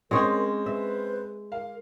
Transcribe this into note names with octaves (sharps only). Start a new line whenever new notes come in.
G#3 C4 C#4 G#4 A#4 C#5
B4 E5
A#4 F5